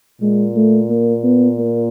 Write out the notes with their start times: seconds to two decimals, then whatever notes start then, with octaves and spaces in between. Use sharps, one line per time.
0.21 A#2 G#3
0.56 A3
0.90 A#3
1.24 B3
1.59 A#3